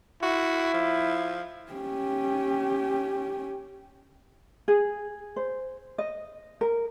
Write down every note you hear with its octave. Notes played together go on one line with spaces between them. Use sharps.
E4 F#4
F3
C#4 G4
G#4
C5
D#5
A#4